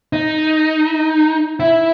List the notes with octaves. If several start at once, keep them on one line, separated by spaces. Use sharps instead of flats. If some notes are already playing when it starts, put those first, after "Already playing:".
D#4
E4